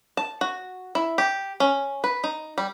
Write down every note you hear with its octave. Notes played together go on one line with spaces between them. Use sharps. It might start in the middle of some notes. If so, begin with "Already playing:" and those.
A5
F#4
E4
G4
C#4
B4
D#4
G3